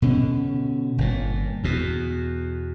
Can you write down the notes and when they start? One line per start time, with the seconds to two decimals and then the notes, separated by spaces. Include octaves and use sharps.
0.02 B2 D3 C#4
0.98 G1 A#2
1.64 E2 B2